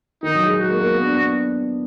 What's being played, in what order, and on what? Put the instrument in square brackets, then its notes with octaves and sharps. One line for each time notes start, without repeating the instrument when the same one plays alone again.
[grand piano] D#3 [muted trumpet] D#4
[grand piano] F#3
G#3
[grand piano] G#3 [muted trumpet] F#4
[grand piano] A#3
A#3
B3
D4
B3